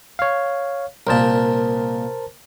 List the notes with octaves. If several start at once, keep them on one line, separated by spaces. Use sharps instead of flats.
C#5 F5
C2 A#2 A#4 C5 A5